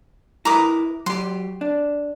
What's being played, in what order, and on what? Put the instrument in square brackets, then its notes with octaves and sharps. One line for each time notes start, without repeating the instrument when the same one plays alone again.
[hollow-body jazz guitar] E4 A#4 B4 [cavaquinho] A#5 D6 D#6
[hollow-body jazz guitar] F#3 G4 [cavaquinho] C6
[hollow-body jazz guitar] D4